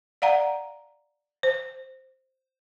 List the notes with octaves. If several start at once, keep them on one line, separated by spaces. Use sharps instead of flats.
D5 F5 F#5 A#5
C5